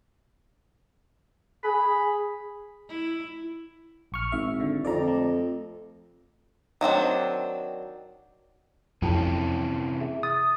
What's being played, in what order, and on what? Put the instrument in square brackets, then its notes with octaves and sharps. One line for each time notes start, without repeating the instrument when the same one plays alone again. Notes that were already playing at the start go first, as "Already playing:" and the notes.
[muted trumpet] G#4 [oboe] B5
[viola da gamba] E4
[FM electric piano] A#1 C#6 F6
[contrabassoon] G#1 [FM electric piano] E5
[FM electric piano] D3
[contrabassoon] F2 [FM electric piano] D5 A#5
[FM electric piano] A3
[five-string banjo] D#3 F#3 C4 D4
[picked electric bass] F2 [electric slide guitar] C3 E3 C#4 [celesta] E4 G5 A5
[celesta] G#4 E5
[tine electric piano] D#6 [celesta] A6